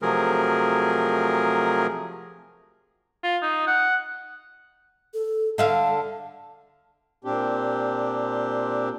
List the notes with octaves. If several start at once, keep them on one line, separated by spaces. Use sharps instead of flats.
C3 F3 F#3 A3 G#4 A#4
F4
D#4
F#5
A4
D3 A4 E5 F5
A#2 C4 D4 G4